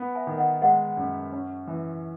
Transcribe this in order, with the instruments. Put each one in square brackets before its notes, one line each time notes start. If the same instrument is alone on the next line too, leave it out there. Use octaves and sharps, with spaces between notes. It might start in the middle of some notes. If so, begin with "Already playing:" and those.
Already playing: [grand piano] B3
[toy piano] E5 G#5
[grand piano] D#3
[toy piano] D#5 F#5
[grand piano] G#3 [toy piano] D#5 F#5
[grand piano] F#2
C#4
E3